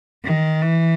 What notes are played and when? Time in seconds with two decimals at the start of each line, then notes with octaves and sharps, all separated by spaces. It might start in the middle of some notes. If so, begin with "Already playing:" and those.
0.25 D#3
0.62 E3